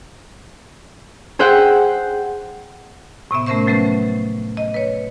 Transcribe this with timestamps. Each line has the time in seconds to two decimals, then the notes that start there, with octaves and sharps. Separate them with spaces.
1.39 G#4 C5 E5 F#5 G5
3.31 A2 C3 B3 E5
3.46 A3 C#4 A#4 C5 E5 C#6
3.66 F3 F#3 A3 C#4 B4
4.57 D#5
4.74 B4 C#5